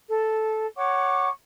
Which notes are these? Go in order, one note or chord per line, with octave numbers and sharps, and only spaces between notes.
A4
C#5 F#5 C#6 D6